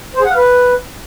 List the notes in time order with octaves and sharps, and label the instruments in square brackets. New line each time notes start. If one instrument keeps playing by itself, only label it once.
[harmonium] C5
G#4
F#5
F5
B4